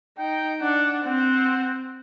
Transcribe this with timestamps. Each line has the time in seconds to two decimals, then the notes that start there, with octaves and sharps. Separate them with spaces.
0.17 D#4 G5
0.61 D4 F#5
1.04 C4 F#5